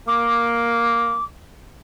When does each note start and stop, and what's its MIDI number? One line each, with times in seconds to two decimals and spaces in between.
0.07 1.17 58
0.07 1.24 86